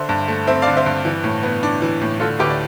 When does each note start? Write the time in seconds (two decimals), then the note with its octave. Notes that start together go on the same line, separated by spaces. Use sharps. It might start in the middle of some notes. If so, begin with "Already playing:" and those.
Already playing: D3 C5 E5
0.09 G2
0.28 A3
0.47 C4 C5 E5
0.62 D5 F5
0.67 D3
0.77 C5 E5
0.86 G2
1.05 E3
1.24 A2
1.43 B3
1.63 D4
1.82 E3
2.01 A2
2.20 D3 F4 A4
2.39 D2 G4 B4
2.50 D5